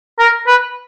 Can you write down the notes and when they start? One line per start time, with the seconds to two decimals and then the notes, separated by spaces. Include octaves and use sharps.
0.19 A#4
0.47 B4